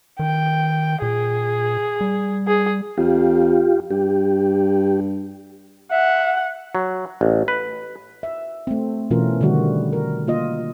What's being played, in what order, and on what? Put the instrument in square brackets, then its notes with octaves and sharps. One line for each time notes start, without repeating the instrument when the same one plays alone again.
[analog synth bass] D#3 [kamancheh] G5
[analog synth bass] A#2 [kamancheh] G#4
[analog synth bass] G3
[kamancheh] G#4
[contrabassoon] F2 [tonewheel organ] F4 G4
[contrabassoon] G2 [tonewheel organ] G4
[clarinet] E5 [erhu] F#5
[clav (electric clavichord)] F#3
A1
B4
[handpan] E5
A3 C4
B2 E3 A3 C#4 F4 A#4
D3 D#3 G3 F#4
A#4
A#3 F4 D#5